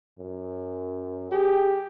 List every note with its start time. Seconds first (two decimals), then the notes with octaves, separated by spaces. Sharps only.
0.19 F#2
1.32 G4 G#4